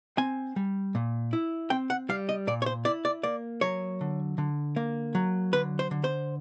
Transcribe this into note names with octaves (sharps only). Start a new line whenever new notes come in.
C4 G#5
G3
A#2
E4
C4 G5
F#5
G3 F5
D#5
A#2 D5
C#5
C5
E4 D5
D5
A#3 D5
F#3 C#5
D3
D3
A#3
F#3
D3 B4
C5
D3
C5